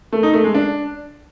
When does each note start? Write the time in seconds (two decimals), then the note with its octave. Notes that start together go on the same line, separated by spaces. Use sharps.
0.13 A3
0.23 D#4
0.34 A3
0.44 G#3
0.54 D4